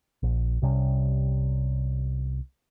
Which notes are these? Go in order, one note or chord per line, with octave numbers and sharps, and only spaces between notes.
A#1
C2 C3 G3 C#4